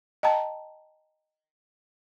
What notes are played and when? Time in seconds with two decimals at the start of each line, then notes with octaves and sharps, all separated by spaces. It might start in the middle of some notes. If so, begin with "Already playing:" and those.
0.23 D#5 G5 A5 A#5